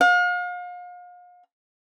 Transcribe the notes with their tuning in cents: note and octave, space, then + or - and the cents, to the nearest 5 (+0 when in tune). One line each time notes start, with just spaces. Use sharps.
F5 +40